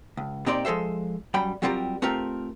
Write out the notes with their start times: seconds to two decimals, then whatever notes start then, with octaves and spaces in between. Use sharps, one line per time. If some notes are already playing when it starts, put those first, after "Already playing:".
0.17 C#2
0.46 A#2 C4 D#4 G4 D5 C6
0.65 F3 G#3 A4 C5 E5
1.34 F#2 G3 G5 B5
1.62 F#3 G3 C4 F4 G4 A#4
2.02 A3 C4 F4 G4 A#4